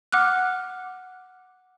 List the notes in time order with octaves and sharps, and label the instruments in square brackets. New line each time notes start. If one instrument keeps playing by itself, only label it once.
[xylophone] F#5 D6 F6 F#6